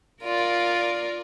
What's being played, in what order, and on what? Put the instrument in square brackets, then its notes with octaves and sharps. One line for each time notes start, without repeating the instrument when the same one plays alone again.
[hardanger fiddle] F4 [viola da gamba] A#4 D5